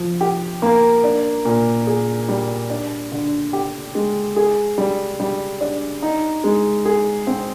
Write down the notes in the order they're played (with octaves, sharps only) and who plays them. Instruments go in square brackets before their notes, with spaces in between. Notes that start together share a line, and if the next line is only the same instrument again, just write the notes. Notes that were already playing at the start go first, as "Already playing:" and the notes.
Already playing: [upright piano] F3
G4
A#3
D4
A#2
G#4
G3
D4
D3
G4
G#3
G#4
G3
G3
D4
D#4
G#3
G#4
C4